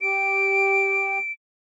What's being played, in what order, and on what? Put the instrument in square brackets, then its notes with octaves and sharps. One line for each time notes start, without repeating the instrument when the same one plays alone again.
[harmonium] G4 [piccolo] D7